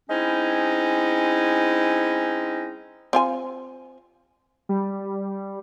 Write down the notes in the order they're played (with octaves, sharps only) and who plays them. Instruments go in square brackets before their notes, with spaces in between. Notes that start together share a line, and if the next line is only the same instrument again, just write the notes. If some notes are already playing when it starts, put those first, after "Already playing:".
[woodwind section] G#3 C4 C#4 D#4 E4
[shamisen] C4 F4 G#5
[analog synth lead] G3